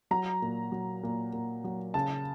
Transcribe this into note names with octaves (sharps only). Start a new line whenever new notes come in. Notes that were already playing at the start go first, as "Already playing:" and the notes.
F#3 A#5
A#2
F#3
A#2
A#2
F#3
C#3 A5